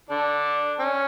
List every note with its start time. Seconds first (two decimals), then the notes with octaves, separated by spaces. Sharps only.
0.09 D3 D4
0.80 C#4